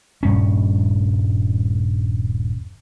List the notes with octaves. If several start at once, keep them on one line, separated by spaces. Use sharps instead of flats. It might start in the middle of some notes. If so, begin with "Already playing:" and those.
D#1 G2 C#4